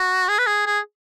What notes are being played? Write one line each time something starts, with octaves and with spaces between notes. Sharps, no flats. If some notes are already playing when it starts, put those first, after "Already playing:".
Already playing: F#4
G#4
B4
G#4
G#4